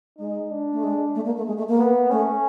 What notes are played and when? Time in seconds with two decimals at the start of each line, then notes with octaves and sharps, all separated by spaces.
0.18 G#3 D#4
0.51 D4
0.72 A3
0.83 G#3
1.15 A3
1.25 A#3
1.37 A3
1.47 G#3
1.57 A3
1.68 A#3
1.78 B3
2.10 A3 C#4